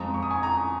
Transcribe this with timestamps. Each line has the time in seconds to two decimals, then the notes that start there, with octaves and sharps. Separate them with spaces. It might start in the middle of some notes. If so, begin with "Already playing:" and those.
Already playing: F2 F3 G#3 A#5 D#6
0.14 C#6
0.23 D#6
0.31 G#5 C#6
0.43 A#5 D#6